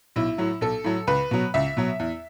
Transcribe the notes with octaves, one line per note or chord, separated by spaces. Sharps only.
B1 E4
A2 F#3
B1 A4
A2 F#3
C#2 B4
B2 F#3
C#2 E5
B2 F#3
E2